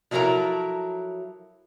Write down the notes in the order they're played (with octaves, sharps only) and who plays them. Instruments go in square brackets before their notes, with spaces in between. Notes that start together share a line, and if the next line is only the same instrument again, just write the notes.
[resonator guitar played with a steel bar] F3 F#3 E4 A4 A#4 A#5